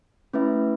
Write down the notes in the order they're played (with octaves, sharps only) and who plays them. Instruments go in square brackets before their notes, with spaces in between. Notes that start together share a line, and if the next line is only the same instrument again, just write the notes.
[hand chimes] A3 C#4 E4 B4 E5